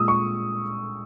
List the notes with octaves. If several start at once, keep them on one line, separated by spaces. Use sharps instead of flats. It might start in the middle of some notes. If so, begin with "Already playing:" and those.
Already playing: A#2 G#3 D#6 E6
C#6